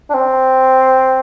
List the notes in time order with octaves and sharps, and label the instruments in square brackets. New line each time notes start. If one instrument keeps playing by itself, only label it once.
[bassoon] D4
C4